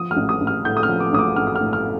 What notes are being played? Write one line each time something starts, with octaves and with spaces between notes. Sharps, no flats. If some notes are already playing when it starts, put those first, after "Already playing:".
Already playing: F3 D#6
F6
A1
D#6
A1
F6
A2 G6
D#6
F6
F3
D6
A1 D#6
D6
A1 F6
D#6
F6
A2
F6